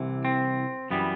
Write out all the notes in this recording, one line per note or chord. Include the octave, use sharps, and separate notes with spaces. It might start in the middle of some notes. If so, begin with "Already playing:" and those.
Already playing: C2 C3 E3
C4
F#2 E3 G3 B3